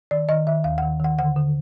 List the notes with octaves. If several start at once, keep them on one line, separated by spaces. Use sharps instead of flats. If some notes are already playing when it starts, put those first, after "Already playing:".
D#3 D5
D#3 D#5
D#3 E5
D#2 F5
D#3 F#5
D#3 F#5
D3 F#5
D3